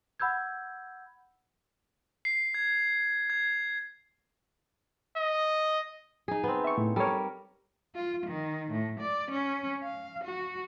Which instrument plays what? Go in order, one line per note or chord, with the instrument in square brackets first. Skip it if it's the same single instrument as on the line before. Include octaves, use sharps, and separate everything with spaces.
[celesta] F#5 B5 E6 G6 G#6
[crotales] C7
G#6
G#6
[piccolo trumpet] D#5
[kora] D#4 G#4
B3 C4
[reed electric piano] E5 C#6
A2
[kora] G3 A#4 [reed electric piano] A4 C#5
[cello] F4
D#3
A2
D5
C#4
F5
F#4